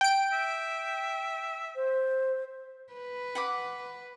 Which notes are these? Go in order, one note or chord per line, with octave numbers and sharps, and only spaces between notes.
G5 D7
E5
C5
B4
F#5 B5 D6